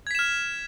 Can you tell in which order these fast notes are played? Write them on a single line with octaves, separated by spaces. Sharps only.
G#6 B6 E7 F6